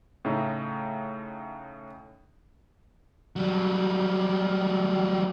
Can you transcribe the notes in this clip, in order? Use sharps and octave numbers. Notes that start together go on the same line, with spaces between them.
A2 C#3 A3 D#4
F#3 G3